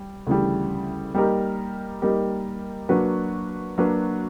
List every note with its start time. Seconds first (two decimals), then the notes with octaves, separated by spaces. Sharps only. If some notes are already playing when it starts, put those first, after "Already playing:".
Already playing: G3
0.27 D2 C#3 E3 G3
1.15 G3 A#3 D#4 G4 A#4
2.02 G3 A#3 D#4 G4 A#4
2.89 F#3 A#3 D4 F#4 B4
3.78 F#3 A#3 D4 F#4 B4